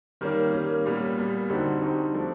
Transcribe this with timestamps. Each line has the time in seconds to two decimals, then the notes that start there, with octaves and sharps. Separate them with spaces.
0.21 D#3 G3 A#3 C#4
0.53 D#3 G3 A#3 C#4
0.86 A#2 G3 B3
1.17 A#2 G3 B3
1.49 D3 G3 C4 D#4 F#4
1.82 D3 G3 C4 D#4 F#4
2.14 F3 A3 D4